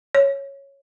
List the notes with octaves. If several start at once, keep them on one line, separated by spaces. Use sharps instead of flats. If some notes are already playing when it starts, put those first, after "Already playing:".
C#5